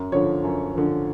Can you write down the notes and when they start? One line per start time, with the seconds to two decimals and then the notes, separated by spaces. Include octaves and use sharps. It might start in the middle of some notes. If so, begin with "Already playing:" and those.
Already playing: F#2
0.12 D3 F3 C#5
0.44 F#2
0.75 D3 F3